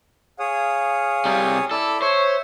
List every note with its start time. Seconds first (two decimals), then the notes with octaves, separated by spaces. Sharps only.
0.39 G#4 C#5 F5 D#6
1.25 C3 G3
1.71 E4 A4 D5
2.02 C5 C#5 E5 C#6